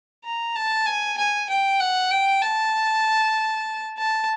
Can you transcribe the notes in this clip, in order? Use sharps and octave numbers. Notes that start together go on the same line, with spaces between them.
A#5
A5
G#5
G#5
G5
F#5
G5
A5
A5